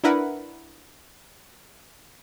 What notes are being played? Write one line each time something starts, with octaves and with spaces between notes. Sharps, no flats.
D4 E4 A#4 B4 F#5